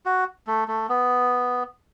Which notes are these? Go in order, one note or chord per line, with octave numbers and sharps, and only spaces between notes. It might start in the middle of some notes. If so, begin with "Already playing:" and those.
F#4
A3
A3
B3